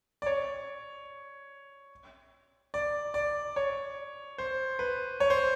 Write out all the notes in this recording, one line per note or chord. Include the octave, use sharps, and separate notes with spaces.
D5
C#5
D5
D5
C#5
C5
B4
C#5
C5